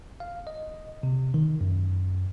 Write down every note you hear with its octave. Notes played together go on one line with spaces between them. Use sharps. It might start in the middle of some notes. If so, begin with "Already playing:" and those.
F5
D#5
C3
D#3
F#2